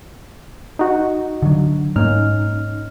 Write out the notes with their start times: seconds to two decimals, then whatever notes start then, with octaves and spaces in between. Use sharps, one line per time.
0.79 D#4 F#4
1.42 D3 F#3
1.96 G#2 A#3 C#4 D#4 F6